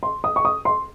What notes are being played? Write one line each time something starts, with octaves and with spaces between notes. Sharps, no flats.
C6
D#6
C#6
D#6
C6